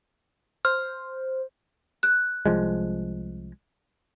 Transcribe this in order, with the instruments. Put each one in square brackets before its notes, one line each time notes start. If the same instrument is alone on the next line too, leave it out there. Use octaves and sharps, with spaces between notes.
[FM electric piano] C5 [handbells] F6
[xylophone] F#6
[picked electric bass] C2 F3 G#3